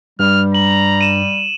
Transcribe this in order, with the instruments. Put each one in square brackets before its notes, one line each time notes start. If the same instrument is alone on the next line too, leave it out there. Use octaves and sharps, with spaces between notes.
[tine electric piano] G2 [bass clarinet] G3 [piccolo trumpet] F6
[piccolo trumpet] A#5 [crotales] F#7
[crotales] D#7 E7